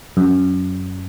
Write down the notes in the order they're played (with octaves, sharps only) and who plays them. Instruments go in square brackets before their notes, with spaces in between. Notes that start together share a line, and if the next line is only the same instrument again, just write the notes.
[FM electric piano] F#2